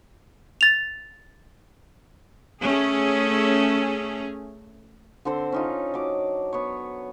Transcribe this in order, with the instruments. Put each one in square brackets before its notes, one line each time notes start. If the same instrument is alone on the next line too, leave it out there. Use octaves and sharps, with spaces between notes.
[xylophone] A6 F7
[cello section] A3 C#4 G#4
[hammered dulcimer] D3 C4 A4 C5
C#4 D#4 F4
F#3 D6
B3 C#5